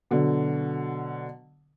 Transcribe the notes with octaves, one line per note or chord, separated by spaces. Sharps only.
B2 D3 F#3